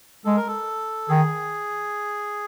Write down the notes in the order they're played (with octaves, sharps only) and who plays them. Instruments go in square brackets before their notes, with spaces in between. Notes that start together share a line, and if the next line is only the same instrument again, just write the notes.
[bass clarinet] G#3 [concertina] A4
[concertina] A#4
A4
[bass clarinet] D#3 [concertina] G#4